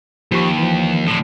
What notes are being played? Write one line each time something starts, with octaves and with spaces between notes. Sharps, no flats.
D#2 F3 G4 C#6
E3 F3
A2 D3